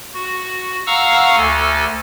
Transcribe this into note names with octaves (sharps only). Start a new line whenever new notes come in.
F#4
F5 F#5 A#5 C#6 E6 F6
D2 A4 G#5